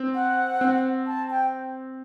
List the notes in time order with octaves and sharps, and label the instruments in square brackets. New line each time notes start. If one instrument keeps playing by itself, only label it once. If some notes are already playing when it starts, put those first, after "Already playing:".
Already playing: [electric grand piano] C4
[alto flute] F#5
[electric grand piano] C4
[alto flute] A5
G5